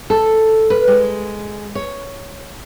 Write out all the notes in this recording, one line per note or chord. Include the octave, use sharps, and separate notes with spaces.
A4
B4
G#3
C#5